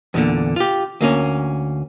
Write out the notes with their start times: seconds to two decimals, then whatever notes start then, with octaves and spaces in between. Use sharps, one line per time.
0.14 E2 A#2 D3
0.56 F4 G4
1.01 D2 A#3 C#4